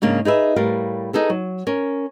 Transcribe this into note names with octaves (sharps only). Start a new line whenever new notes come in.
G#2 C#3 A#3 D4
D#4 G#4 B4 E5
A2 G3 A#4 F5
D#4 G#4 A4 B4
F#3
C#4 A#4